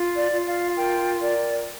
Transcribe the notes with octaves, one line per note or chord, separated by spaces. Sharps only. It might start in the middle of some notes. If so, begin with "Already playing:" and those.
Already playing: F4
D5
F4
F5
A#4 G5
A#4 D5